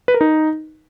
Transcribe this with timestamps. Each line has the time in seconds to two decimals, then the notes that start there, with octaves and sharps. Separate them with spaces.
0.08 B4
0.14 A#4
0.21 D#4